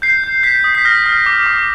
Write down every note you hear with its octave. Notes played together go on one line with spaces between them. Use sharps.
G6 C7
G6
G6 B6
D#6
B6
F6 A#6
F6
D6
D6